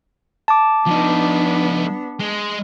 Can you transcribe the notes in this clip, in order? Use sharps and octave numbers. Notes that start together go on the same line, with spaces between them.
A5 D6
F3 B3 D4 D#4
G#3